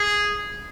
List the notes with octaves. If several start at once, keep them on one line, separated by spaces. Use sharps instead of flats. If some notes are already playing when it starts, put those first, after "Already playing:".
Already playing: G#4